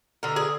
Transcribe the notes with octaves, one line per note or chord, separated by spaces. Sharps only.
D3 A#4
G#4